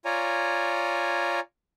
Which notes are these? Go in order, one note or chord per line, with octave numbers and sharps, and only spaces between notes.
F4 C#5 D5 G#5 A#5